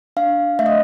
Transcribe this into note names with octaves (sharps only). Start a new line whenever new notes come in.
D4 F5
A3 E5
D#5